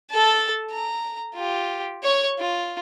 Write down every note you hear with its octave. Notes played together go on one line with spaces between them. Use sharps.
A4 A5
A#5
F4 G4
C#5 C#6
F4